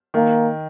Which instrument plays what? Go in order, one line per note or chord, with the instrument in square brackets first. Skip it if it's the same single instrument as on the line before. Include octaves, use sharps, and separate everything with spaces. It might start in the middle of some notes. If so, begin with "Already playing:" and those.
[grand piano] D#3 [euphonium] A#3